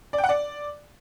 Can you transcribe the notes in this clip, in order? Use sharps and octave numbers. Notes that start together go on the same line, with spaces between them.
D5
G5
F#5
D5